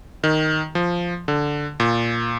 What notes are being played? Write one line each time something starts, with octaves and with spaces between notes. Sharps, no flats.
D#3
F3
D3
A#2